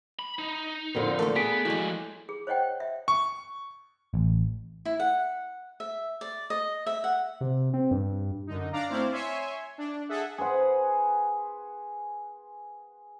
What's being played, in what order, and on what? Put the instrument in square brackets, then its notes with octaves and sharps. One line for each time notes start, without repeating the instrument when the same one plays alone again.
[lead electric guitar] B5
D#4
[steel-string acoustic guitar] F2 A#2 D3
[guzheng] A3 A#3 [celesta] A#4
[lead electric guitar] B3 [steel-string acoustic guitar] G#4 [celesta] B6 D7
[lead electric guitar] F3 F#4 [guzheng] G#3 G4 [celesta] E4
[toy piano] G#4
C5 C#5 D#5 F#5 G5
E5
[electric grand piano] C#6
[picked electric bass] A1
[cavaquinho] E4
F#5
E5
D5
D#5
E5
F#5
[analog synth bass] C3
C4
G2
[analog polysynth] F#2 D3 D#4
D4 D5 F5 A#5
A3 C4 E4 C5 D5 F5
C#5 E5 G#5 C6
D4
G#4 A4 E5 F#5
[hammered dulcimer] G#4 B4 C5 F#5